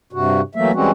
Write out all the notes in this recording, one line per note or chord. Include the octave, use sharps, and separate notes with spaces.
G2 C3 F#4
E3 F#3 A3 A#3 E5
E3 G3 G#3 C4 C#4 F#4